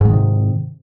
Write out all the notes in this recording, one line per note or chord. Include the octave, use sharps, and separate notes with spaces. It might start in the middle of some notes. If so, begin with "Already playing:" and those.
G#2 C3 D#3 F#3